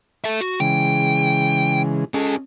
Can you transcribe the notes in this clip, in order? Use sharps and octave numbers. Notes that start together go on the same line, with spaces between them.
A4 E5
F#4
C#3 E3 G#3 G5
C#4 F4 G#4 A4 D#5